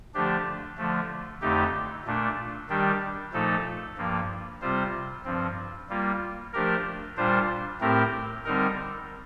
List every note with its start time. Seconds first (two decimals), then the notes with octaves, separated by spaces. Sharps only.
0.14 D3 F3 A3 D4 G4
0.78 D3 F3 A3
1.41 F2 D3 A3 D#4 G4
2.06 A#2 A3 D4
2.69 D#3 G3 D4 G4
3.33 A#2 F3 A3 D#4 A4
3.98 G2 F3 A#3
4.61 C3 G3 C4 F4 C5
5.25 G2 F3 C4
5.90 G3 A#3 F4
6.53 F3 A3 D4 G4 A#4
7.17 A#2 G3 D4 F4 C5
7.81 A2 A3 C4 G4 A#4
8.45 D3 G3 C4 D#4 A#4